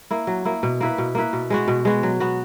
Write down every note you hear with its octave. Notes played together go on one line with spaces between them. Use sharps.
A#3 E4
F#3
A#3 E4
B2
A#3 E4 B4
B2
A#3 E4 B4
B2
G#3 B3 F#4
B2
G#3 B3 F#4
F#3
B3 F#4